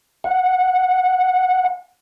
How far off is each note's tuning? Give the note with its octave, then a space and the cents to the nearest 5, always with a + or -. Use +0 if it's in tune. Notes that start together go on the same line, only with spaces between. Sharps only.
F#5 -15